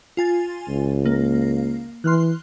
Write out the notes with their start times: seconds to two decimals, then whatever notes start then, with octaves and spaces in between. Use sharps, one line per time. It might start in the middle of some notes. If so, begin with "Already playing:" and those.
0.17 F4 G#5 A6
0.68 C#2
1.06 A#3
2.04 E3 C6 F6 F#6